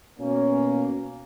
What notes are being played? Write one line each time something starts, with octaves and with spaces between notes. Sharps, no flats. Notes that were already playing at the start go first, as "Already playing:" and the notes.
B2 A#3 C#4